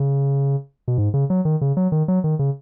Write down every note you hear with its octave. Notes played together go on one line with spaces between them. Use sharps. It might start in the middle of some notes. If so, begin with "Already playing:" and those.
Already playing: C#3
B2
G#2
C#3
F#3
D#3
C#3
F#3
D#3
F#3
D#3
C#3